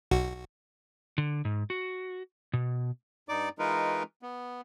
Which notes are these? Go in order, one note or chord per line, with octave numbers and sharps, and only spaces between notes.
B1 F#4
D3
G#2
F#4
B2
G2 D#4 D5 D6
E3 G#3 D#4 F4 A#4 B4
B3